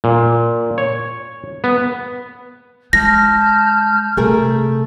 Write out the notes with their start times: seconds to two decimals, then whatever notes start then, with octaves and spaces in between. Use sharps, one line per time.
0.04 A#2
0.78 C#5
1.64 B3
2.93 G#3 A5 F6 G6 A#6
4.17 C3 A3 G#4 A#4